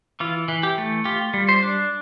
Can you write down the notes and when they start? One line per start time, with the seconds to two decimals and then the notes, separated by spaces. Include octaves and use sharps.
0.20 E3 F4
0.48 E3
0.63 G4
0.78 A3
1.05 F4 G4
1.34 G3
1.49 C5
1.63 D4